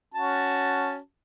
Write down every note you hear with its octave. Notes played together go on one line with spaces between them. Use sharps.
C#4 F#4 A5